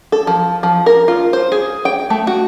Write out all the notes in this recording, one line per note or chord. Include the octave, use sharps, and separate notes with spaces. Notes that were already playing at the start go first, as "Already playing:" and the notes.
A4
F3
F3
A#4
F4
C5
G#4
G5
A3
F#4